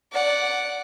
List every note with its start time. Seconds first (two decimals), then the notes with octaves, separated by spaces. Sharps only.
0.12 D5 F#5